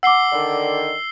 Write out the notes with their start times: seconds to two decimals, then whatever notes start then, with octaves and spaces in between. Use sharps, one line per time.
0.03 F#5 D6 E6 C7 G7
0.32 D3 D#3